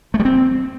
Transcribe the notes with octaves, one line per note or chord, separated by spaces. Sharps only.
A3
G3
C4